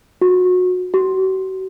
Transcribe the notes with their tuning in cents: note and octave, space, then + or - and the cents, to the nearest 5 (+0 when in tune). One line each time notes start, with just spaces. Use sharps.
F#4 -25
F#4 +40